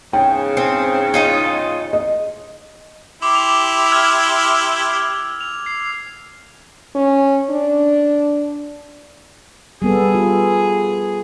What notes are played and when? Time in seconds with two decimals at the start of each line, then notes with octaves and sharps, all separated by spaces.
0.13 E2 G#2 C#3 G5
0.57 C4
1.14 D#4 F4 D#5
1.93 D#5
3.22 E4 G4 C6 D6
3.35 F7
3.92 E6 F6 G#6
5.41 F7
5.66 C7
6.95 C#4
7.50 D4
9.82 G3 B3 G#4 A4
10.15 F4